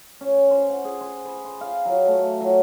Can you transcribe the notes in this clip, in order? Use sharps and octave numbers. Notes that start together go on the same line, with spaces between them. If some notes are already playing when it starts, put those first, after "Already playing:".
C#4
C5
F#5
G#4
C5
B4
C6
F5
F#3
A3
F#3